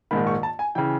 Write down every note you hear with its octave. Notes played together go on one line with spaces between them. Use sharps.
A#1 G#2 D#3 B5
C#6
A5
G#5
C#3 E3 G5